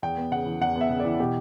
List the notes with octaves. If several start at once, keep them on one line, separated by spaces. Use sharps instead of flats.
E2 G5
B3
C#3 F#5
E3
E2 F#5
B3 E5
C#3
D5
E3
B2 G4